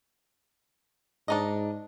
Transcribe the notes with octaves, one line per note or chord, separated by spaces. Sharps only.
G#2 D4 D#4 D#5